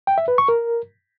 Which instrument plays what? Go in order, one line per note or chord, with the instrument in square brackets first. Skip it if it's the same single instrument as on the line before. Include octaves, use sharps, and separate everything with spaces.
[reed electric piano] G5
E5
B4
C#6
A#4